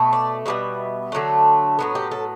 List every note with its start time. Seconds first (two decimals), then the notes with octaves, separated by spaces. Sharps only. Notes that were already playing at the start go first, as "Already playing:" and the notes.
Already playing: B2 A3
0.13 D5
0.46 B2 G3 B3 E5
1.12 D3 F#3 A3
1.79 A2 F#3 B3
1.95 G4
2.11 A4